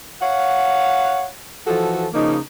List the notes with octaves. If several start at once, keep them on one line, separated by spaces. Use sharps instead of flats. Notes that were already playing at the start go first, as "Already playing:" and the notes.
C#5 F5 F#5
E3 F3 F#4 A4
C#3 F3 A#3 D#4